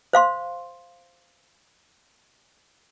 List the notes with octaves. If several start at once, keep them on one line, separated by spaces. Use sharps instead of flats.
C5 F5 C6